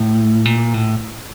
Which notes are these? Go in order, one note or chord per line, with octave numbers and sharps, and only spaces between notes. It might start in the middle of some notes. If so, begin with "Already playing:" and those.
Already playing: A2
A#2
A2